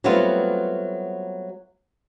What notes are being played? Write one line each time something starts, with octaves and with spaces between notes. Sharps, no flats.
F#3 G3 A3 B3 C4 F4